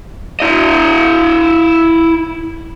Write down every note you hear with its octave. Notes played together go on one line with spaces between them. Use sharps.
E4 D#5